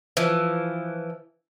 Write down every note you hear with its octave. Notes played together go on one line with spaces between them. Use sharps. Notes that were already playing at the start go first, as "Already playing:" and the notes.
E3 F3